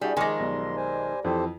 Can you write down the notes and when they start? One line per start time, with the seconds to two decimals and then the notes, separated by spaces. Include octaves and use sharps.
0.01 G3 D4 E4 F#4 G#4
0.17 D#3 F3 G#3 G#5 C6 D6 A#6
0.40 B1 G3
0.76 C5 G#5
1.24 F2 E3 G4 A4 C5